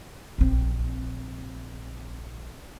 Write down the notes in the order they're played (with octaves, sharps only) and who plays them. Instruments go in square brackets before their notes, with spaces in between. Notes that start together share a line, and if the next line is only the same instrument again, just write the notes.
[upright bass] A#1 C4